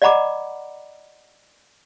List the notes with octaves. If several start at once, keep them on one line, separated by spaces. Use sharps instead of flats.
D5 D#5 F#5 A#5 B5 D6